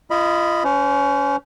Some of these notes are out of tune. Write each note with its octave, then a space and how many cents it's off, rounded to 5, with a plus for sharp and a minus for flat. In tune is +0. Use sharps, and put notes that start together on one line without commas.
F4 -30 D#5 +0 B5 +0
C#4 +25 C5 -35